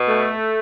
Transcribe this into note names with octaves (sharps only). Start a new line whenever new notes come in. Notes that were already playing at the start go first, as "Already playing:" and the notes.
Already playing: B2
A3